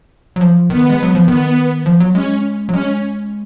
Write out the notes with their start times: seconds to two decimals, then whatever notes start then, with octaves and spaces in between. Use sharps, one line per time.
0.36 F#3
0.41 F3
0.70 D#3 B3
0.89 G#3
1.03 F#3
1.15 F3
1.27 D#3 B3
1.86 F3
2.00 F#3
2.15 G#3 C#4
2.69 F#3
2.73 G#3 C#4